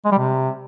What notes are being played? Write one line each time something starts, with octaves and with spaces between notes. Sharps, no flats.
G#3
G3
C3